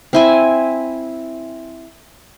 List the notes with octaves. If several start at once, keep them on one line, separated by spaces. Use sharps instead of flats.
C4 E4 G#5